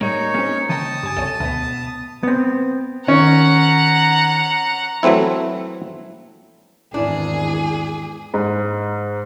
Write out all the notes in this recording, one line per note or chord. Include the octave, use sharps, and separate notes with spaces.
A2 G3 A#3 D#4 G#4 A#4 C#5
G#3 A#3 C4 C#4
C#3 E3 G5 A5 A#5 D#6
G2 G#5
C2 A4 C#5 G#5
D2 B2 B3
B3 C4
D#3 C#4 F#5 A#5
E3 F#3 A3 C4 E4
G#1 E2 E3 D4 E4 G#4 A#4
G#2